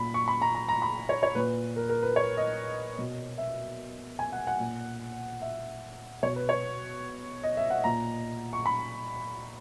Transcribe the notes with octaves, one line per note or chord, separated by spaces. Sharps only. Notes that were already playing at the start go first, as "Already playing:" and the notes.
Already playing: A#2 B5
C#6
B5
A#5
A#5
A#5
B5
C#5
C#5
A#2 B4
A#4
A#4
B4
C#5
D#5
B2
E5
G#5
F#5
F#5
A#2
E5
B2 C#5
B4
C#5
D#5
E5
F#5
A#2 A#5
C#6
B5